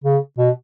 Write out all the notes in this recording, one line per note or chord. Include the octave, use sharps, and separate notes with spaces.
C#3
B2